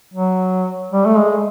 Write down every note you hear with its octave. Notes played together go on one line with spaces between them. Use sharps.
F#3
G3
A3
G#3